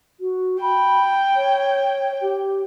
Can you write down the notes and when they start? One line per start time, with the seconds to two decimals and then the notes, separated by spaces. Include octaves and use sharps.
0.20 F#4
0.61 G5 B5
1.35 C#5
2.21 G4